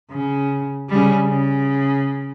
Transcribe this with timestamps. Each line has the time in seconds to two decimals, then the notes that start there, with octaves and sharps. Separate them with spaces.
0.11 C#3
0.89 C#3 G3
1.24 C#3